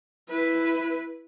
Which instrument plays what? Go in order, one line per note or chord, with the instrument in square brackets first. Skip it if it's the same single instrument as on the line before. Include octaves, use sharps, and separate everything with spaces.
[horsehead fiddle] E4 B4